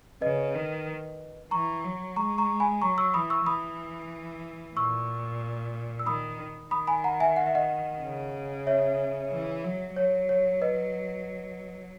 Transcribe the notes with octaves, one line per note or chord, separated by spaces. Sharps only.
C#3 B4 D#5
D#3
E3 A#5 C#6
F#3
G#3 A#5 C#6
A#5 C#6
G#5 B5
F#3 A#5 C#6
C#6 E6
E3 B5 D#6
C#6 E6
E3 B5 D#6
A#2 C#6 E6
E6
D#3 B5 D#6
D#3 B5 D#6
G#5 B5
F#5 A#5
E5 G#5
F#5
E5
D#5 F#5
C#3
C#5 E5
E3
F#3
F#3 C#5
C#5
B4 D#5